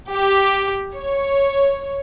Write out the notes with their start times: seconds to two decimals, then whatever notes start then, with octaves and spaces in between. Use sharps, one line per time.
0.10 G4
0.95 C#5